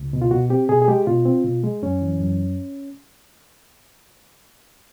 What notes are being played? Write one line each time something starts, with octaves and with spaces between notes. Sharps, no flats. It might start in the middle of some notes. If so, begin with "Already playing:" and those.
Already playing: C#2
B2
F4
B2 F#4
C4 G4
B2 G#4
G#4
G#3 G4
B2 F4
C4
B2
G#3
F#2 C#4
E3
F#2